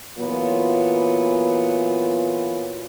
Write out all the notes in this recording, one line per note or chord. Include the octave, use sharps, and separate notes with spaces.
A#2 E3 F#3 B3 F4